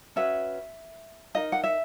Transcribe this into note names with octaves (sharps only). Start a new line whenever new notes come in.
C#4 F#4 B4 E5
D#4 A#4 D#5
F#5
E5